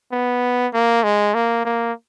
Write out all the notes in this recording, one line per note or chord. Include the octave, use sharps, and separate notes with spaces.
B3
A#3
G#3
A#3
A#3